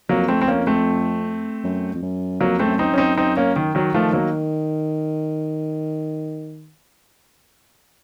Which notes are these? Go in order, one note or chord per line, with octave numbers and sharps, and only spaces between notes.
F2 F#3 A#3
A3 C4
C4
A#3 C#4
A3 C4
F#2
F2
F#2
F2 F#3 A#3
A3 C4
F#2
C4 D#4
F#2 C#4
C4 D#4
C4 D#4
A#3 C#4
D#3
D#3 F#3
D#3 F3 A3
F#3 A#3